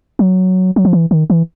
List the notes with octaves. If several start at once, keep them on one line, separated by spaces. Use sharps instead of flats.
F#3
F#3
F3
E3
D#3
E3